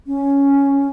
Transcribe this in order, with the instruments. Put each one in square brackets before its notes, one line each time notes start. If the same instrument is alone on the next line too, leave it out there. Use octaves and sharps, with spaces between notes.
[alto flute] C#4